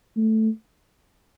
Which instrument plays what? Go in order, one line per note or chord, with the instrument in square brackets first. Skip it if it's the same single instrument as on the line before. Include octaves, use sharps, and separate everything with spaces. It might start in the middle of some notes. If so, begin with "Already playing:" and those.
[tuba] A3